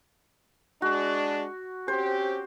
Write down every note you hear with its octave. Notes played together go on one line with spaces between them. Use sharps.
G#3 D4 F#4
C4 C#4 G4 C5